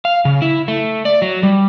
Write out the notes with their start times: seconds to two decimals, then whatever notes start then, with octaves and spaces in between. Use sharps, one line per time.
0.05 F5
0.25 C#3
0.42 E4
0.68 A3
1.05 D5
1.22 F#3
1.43 G3